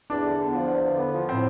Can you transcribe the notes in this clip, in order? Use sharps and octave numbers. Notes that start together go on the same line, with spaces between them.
E2 D4
D3
B3
F3
E2
D3
B3
F3
A2 C4